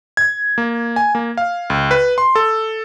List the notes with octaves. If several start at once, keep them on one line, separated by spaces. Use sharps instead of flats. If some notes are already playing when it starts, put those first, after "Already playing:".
G#6
A#3
G#5
A#3
F5
C#2
B4
C6
A4